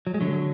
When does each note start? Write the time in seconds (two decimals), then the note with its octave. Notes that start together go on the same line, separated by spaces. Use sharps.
0.07 F#3
0.14 G#3
0.21 D3 F#3